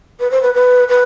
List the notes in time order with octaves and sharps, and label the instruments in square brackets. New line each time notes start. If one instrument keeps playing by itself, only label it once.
[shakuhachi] B4
C5
B4
B4
B4